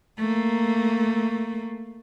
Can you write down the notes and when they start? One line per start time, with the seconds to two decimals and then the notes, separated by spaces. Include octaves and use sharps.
0.18 A3 A#3